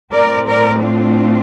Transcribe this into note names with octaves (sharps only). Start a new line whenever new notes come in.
A2 A3 C4 A#4 D5
A#4 D5
D4 F4